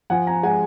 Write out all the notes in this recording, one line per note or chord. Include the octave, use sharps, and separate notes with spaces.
F3 F#5 G#5
G#5 A#5
G#3 F#5 G#5